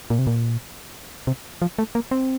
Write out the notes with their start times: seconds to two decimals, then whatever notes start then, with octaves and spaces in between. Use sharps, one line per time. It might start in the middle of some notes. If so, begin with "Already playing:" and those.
0.10 A#2
0.19 C3
0.27 A#2
1.27 C3
1.62 F3
1.79 A3
1.95 A#3
2.11 C4